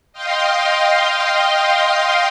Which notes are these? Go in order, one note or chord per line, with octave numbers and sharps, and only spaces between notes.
D#5 F5 G5 C6